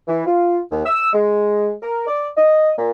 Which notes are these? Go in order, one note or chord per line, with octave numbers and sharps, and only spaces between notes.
E3
F4
D#2
E6
G#3
A#4
D5
D#5
A#2